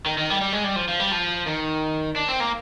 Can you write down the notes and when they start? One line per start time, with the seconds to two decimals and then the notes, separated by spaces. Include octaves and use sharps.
0.06 D#3
0.18 D#3
0.30 G3
0.41 G3
0.53 G#3
0.64 G3
0.76 F3
0.88 F3
1.00 G3
1.11 F3
1.46 D#3
2.16 D4
2.28 C4
2.40 A#3